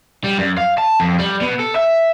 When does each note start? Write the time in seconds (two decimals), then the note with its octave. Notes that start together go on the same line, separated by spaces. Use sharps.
0.24 G3
0.38 F#2
0.58 F5
0.78 A5
1.00 F2
1.19 G3
1.41 B2
1.59 A4
1.76 E5